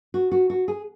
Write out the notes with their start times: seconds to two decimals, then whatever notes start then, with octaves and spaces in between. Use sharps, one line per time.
0.14 F#4
0.31 F#4
0.50 F#4
0.68 G#4